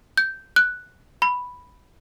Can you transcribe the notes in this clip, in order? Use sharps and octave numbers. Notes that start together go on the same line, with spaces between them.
G6
F#6
B5